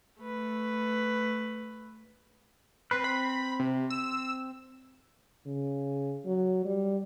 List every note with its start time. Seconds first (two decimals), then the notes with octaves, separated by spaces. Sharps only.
0.21 A3 B4
2.91 C4 B4 C6 F#6
3.04 B5
3.59 C3
3.90 E6
5.47 C#3
6.26 F#3
6.65 G3